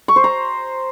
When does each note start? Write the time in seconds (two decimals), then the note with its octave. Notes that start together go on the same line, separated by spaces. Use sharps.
0.08 C#6
0.16 C5
0.24 A#5